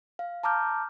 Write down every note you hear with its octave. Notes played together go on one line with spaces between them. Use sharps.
F5
A5 A#5 D6 F6 G6